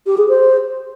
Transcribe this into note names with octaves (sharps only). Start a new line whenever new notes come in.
G4
G#4
C5